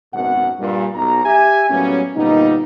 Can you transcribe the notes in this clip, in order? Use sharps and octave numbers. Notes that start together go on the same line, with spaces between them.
G#1 F#2 B2 F#5
G2 A#2
B1 A#5
G4 E5 G#5
A2 F#3 G3 A#3 B3 C#4
G1 A#2 G3 A#3 B3 D#4